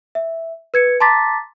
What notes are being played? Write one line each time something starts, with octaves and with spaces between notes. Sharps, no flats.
E5
B4 G#6 C#7
A5 A#5 C6 D6 A6 B6